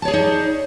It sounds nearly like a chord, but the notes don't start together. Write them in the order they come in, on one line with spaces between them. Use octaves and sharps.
A5 C#5 G#4 D5 D#4